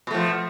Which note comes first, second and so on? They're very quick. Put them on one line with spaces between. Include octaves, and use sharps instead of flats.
B2 A3 F3